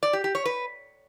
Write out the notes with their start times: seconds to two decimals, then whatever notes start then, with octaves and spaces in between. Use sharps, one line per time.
0.03 D5
0.13 G4
0.24 G4
0.35 C#5
0.45 B4